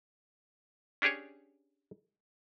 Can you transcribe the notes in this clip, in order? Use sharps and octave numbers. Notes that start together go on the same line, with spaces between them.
C#4 D4 G4 G#4 C#5